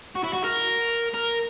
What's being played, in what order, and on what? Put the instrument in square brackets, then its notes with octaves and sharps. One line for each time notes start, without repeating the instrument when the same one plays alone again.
[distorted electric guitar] F#4
E4
F#4
A#4
A#4